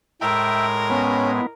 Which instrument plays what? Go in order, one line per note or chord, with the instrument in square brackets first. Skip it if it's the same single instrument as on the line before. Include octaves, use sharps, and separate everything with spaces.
[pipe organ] A2 G#3 [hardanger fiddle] A#4 [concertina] E5 G5
[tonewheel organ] B3 [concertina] C#4